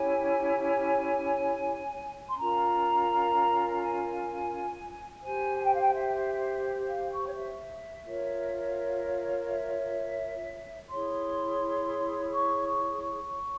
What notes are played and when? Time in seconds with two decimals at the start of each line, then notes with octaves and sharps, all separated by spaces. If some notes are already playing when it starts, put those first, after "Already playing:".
Already playing: C#4 E4 G4 C#5 G#5
2.28 C6
2.38 C#4 F4 A#4 A#5
3.71 A#5
3.80 G#5
5.21 G4 C5 G#5
5.57 G#5
5.64 G5
5.73 F5
5.80 G5
5.93 E5
6.87 F5
7.11 C#6
7.28 C#5
7.35 E5
8.06 F4 A#4 C#5
9.48 E5
10.90 E4 G#4 C#5 C6
12.33 C#6
12.68 C#6
13.03 C#6